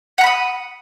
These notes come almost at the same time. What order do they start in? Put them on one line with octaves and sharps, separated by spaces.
F#5 A#5 B5 D#6